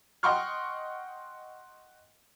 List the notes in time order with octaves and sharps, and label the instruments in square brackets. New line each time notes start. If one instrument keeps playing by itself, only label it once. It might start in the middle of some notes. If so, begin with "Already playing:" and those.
[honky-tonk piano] D#5 F#5 G5 C6 C#6 F6